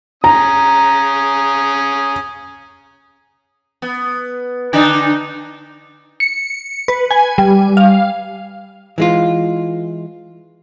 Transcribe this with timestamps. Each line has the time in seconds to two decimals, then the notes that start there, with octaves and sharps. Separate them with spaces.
0.24 C#4 A#5 D#6
3.82 B3
4.73 D3 D4 D#4
6.20 C#7
6.88 B4
7.11 G#5
7.38 G3
7.77 F5
8.98 E3 G#3 F4